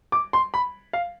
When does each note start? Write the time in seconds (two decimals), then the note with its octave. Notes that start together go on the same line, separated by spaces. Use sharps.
0.12 D6
0.33 C6
0.54 B5
0.93 F5